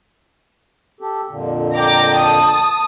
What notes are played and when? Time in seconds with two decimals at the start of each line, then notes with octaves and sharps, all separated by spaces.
1.01 G4 A4
1.29 F2 A#2 D3
1.73 G5 A#5 D6
2.15 A5 D#6